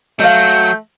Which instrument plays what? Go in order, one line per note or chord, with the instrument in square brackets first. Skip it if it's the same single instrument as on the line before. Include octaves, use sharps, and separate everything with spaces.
[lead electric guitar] F#3 [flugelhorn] A3 [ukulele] E5 F5 [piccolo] G6